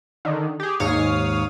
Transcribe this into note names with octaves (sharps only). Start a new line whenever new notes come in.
D3 D#3
G4 G#4
D#2 G#2 C#5 F5 D#6 F6